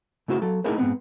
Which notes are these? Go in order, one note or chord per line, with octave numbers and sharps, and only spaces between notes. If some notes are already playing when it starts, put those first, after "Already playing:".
C#3 A3 E4 F#4 C5
F#3 A4
A3 D#4 E4 G#4 A#4 C5
G#2 C3 B3 C4